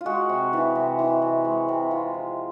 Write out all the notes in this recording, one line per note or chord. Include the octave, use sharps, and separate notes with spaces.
F4
G#3 F#4
C3
E3
C3
E3
C3
G#3
C3
C4 F4
F3